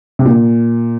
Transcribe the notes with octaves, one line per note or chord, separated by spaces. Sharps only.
C3
A#2